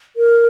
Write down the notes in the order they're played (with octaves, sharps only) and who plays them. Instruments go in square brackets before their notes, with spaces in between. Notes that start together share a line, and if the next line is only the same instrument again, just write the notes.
[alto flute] A#4